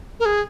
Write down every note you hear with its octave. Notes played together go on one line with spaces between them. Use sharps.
A#4
G#4